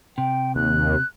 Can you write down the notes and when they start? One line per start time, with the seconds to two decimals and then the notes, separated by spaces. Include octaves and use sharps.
0.18 C3 G5
0.56 D#2 F#6